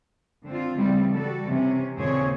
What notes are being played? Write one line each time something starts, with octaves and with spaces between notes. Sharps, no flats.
D3 C4 F4
C#3 E3 G3 A3 C4
G3 F#4 A4
C3 E3 C#4
D#2 A#2 C#3 C4 G#4 C#5